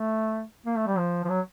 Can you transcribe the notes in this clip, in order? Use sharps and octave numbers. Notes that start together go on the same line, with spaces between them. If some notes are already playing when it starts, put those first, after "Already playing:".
Already playing: A3
A#3
A3
G3
F3
F3
F#3